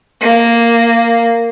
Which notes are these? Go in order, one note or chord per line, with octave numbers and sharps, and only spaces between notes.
A#3